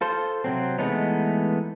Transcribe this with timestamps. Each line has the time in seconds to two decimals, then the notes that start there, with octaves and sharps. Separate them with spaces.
0.01 F4 A4 C5
0.44 C3 F#3 C4
0.78 E3 G#3 A3 B3 D#4